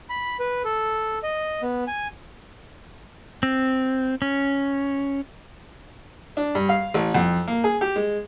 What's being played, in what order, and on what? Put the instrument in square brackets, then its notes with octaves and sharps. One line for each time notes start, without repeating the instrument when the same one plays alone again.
[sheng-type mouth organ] B5
B4
A4
D#5
B3
G#5
[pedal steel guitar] C4
C#4
[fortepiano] D4
G2
F5
A1
F2
A#3
G#4
G4
G#3